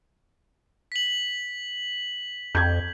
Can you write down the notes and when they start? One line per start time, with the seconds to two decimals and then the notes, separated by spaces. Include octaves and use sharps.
0.92 B6 F#7
2.55 F2 G6 G#6